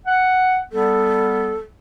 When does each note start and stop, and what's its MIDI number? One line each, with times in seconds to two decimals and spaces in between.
0.06 0.59 78
0.72 1.58 55
0.72 1.58 59
0.72 1.56 69